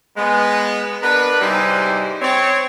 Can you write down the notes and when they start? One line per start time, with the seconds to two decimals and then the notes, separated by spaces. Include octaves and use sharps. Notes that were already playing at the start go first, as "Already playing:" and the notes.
0.17 G#3 B3
1.02 B3 D4 A#4 B4
1.41 G#2 C3 G3 D#4 E4 C5
2.22 C4 C#5